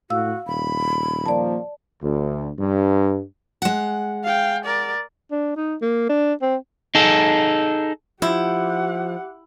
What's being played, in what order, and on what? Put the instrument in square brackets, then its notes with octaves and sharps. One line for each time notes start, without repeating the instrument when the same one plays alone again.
[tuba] A2 [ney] F#4 [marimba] F5 E6
[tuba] D#1 [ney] B5
[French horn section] F3 A#3 [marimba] D5 A5
[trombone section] D2
G2
[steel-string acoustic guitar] G#3 F#5
[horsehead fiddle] F5 G5
A#4 D5
[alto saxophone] D4
D#4
A#3
D4
C4
[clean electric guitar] D#4 G#4 A4
[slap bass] F3 [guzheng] E4 [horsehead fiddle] G4 F#5